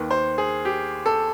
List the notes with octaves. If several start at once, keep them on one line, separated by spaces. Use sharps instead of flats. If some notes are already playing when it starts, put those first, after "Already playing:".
Already playing: D#2 D#3 B4
C5
G#4
G4
A4